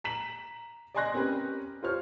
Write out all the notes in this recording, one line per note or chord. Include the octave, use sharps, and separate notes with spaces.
A#5 B6 E7 F#7
D5 D#5 G#5 C6 F#6 A#6
C4 C#4 G4 A#4 B4
F4 G4 C5 C#5 F6